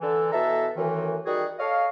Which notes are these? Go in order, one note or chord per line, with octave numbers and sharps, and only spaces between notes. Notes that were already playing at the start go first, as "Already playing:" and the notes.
D3 E3 A4
B2 E3 A4 E5 A5 A#5
F#2 A2 D#3 E3
D#3 G3 F#4 G#4
A4 C#5 D#5 F5